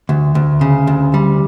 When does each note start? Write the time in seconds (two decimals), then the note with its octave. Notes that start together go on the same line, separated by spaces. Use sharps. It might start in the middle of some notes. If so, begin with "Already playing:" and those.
0.09 D2
0.35 D2
0.61 C#3
0.87 D2
1.14 G3